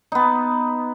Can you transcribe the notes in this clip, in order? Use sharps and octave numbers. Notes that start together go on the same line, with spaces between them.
B3 D#4